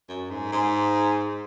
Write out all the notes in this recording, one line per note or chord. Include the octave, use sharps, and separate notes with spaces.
F#2
G#2
G#2